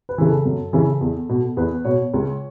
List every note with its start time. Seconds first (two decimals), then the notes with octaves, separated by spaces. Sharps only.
0.09 B4
0.18 C#3 E3
0.27 A4
0.45 F#2
0.73 C#3 E3
1.01 E2
1.29 B2
1.57 E2 B4
1.85 B2 C#5
2.14 C#2